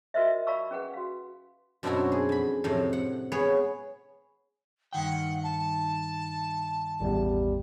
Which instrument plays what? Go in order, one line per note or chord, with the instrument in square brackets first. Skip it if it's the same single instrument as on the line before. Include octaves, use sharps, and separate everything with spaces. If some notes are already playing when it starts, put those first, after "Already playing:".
[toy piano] F4 F#4 A#4 C5 D#5 E5
D5 F5 A#5 B5 C#6 E6
C#4 G#4 B4 F#5
F#4 F5
[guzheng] F#2 B2 C4 D4 E4 F#4
G#4
F2 B5
F2 A2 C3
F#5
B3 G#4 B4 C#5
[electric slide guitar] G2 D#3 G5 [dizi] F#5
[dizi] A5
[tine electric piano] A1 E2 [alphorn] G3